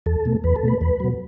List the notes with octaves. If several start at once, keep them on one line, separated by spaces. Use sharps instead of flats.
E2 A4
B2 A3
E2 B4
A4
B2 A3 B4
E2 B4
B2 F#3